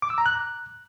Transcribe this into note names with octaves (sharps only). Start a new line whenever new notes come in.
D6
E6
A#5
F#6